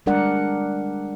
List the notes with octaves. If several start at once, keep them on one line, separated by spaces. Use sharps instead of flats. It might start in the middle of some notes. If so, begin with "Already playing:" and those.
G3 G#3 D4 A#4 D5 F#5